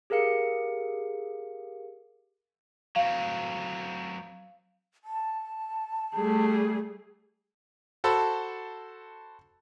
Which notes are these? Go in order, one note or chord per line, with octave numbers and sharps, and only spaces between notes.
G4 G#4 A#4 F5 C#7
F#3 C4 F5
A5
G3 A3 G#4
F#4 A4 C5 A5 B5 E6